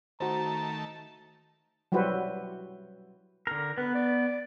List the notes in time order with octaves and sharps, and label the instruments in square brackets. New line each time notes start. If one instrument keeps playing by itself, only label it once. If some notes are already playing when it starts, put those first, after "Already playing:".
[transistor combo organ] D#3 A3 A5 [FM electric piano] F#4 C5 [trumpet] A#5
[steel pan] F#3 G3 E4 F#4 B4 C5
[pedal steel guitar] D3 A#4
[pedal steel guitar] B3 [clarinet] B4
[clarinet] D5